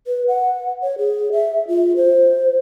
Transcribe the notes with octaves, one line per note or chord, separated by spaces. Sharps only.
B4
F#5
C#5
G#4
E5
F4
C5